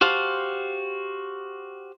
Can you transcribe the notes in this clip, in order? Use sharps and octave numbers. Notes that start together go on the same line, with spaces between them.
F#4 G4 C5 F5 A5